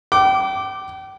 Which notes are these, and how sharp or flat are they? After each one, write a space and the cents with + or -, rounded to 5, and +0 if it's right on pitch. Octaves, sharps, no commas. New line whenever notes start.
G5 -35 D6 +0